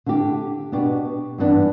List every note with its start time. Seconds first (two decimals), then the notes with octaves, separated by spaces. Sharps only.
0.06 D3 A3 E4 G4
0.72 B2 B3 D4 G4
1.38 G2 E3 B3 D4